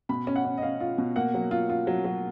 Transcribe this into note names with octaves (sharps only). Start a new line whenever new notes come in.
B2 B5
C#4
F#5
C#4
D#5
C#4 F5
F4
B2
A#3 F#5
F#3
F4
F4
F#3
F#3